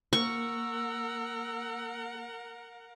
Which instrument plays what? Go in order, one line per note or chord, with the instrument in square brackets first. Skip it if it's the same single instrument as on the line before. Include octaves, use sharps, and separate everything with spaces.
[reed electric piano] A#3 [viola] A#4 F#5 [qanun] C#6 [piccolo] E6